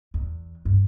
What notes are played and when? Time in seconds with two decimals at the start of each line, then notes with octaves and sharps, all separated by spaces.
0.14 E2
0.65 G2